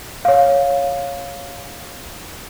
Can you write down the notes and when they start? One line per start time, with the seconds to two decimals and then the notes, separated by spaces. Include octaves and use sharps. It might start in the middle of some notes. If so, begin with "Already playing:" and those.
0.25 C#5 F5